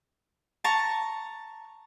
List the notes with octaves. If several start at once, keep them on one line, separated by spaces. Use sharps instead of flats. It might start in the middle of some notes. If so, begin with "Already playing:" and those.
A5 A#5 C#6